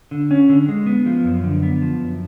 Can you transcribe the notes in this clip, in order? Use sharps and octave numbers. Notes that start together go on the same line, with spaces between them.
D3
C#4
D3
G#3
B3
F3
F#2
D3
B3
F3
F#2